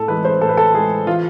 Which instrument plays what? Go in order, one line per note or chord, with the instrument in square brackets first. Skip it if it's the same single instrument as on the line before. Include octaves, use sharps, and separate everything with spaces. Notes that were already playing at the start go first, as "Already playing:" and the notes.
Already playing: [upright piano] A2 A4
E3 G#3 B4
C5
A2 A4
B4
A4
E3 G#3 G#4
E3 F4